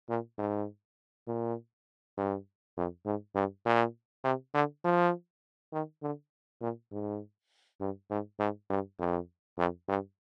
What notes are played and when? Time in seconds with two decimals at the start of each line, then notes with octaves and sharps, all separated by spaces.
0.09 A#2
0.39 G#2
1.27 A#2
2.18 G2
2.77 F2
3.06 G#2
3.35 G2
3.66 A#2
4.24 C3
4.54 D3
4.85 F3
5.73 D#3
6.02 D3
6.61 A#2
6.92 G#2
7.81 G2
8.10 G#2
8.39 G#2
8.70 G2
8.99 F2
9.58 F2
9.89 G2